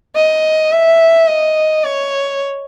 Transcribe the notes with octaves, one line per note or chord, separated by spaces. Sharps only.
D#5
E5
D#5
C#5